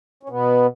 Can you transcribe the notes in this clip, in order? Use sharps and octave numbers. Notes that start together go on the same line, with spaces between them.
C#4
B2 B3